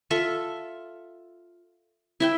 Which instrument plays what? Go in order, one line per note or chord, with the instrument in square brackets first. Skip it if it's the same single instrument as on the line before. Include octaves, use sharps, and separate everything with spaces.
[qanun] F4 A4 E5
E4 E5 G5